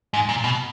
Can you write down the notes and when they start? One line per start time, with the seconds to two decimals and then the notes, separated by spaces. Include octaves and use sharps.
0.14 G#2
0.29 A#2
0.44 B2